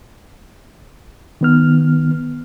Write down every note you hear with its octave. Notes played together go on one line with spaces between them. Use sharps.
D#3 B3 F6